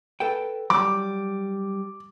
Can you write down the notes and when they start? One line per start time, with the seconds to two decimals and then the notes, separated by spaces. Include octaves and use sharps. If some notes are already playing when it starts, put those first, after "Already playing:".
0.20 A4 B4 G5
0.70 F#3 G3 D6